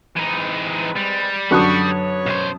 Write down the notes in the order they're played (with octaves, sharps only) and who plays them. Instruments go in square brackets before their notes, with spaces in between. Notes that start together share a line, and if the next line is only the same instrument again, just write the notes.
[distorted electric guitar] E3 D#4 [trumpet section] G#3 C4 B4
[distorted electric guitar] G3
[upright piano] F#2 A5 D#6 [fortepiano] D3 F#4 F#6 [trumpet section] B5 C#6
[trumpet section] B4 C#5
[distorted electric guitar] B1 C5